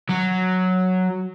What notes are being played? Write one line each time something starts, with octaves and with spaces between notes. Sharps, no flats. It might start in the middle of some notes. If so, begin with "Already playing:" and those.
F#3